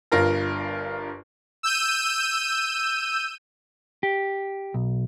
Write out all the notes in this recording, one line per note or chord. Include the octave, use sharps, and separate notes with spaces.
G1 G2 F4 A#4 A#6
E6 G6 D#7
G4
B1